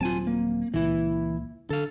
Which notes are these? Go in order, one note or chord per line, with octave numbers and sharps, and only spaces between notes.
D#1 F#3 C4 F4 G#5 A5
A#3
C#2 A#2 C#3 E3 E4
D3 A4 F5